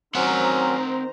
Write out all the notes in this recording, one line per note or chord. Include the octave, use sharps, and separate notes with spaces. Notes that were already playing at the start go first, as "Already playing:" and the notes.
D#3 F#3 C4 C#4 C5 F#5 A#5